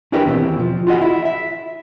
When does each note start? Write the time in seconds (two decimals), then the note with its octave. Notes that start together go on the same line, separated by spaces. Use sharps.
0.12 C#4 D4 E4 G4 A#4 B4
0.26 D#2 B2 E3 C4
0.59 F3
0.87 F4 F#4 G#4 D#5 F#5
1.01 E4
1.25 E5